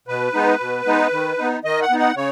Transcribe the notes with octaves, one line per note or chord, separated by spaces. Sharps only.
B2 B4
G#3 B3 D#4
B2
G#3 B3 D#4
D#3
B3 D#4
D#3 D#5
F#5
B3 D#4
F#5
C#3 C#5